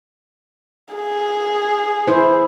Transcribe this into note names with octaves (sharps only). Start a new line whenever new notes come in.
G#4
E4 C5